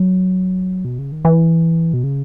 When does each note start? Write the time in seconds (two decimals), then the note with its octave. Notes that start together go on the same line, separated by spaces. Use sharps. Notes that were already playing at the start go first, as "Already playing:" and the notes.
Already playing: F#3
0.85 B2
0.99 C#3
1.12 D#3
1.25 E3
1.94 B2
2.04 C#3